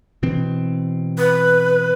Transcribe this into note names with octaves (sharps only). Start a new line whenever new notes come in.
B2 E3 C4
B4